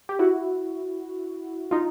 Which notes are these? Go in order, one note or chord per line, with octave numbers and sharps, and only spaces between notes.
G4
E4 F#4
D#4 F4